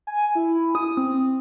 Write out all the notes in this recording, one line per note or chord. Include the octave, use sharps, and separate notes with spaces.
G#5
E4
D#6
C4